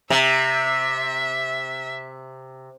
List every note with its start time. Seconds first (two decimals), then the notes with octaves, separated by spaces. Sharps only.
0.10 C3 E5